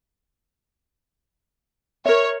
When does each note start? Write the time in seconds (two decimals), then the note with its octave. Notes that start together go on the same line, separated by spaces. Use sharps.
2.05 A#4 C#5 E5